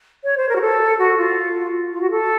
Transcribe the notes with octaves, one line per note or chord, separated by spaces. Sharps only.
C#5
C5
A#4
F#4
A4
F#4
F4
F4
F#4
A4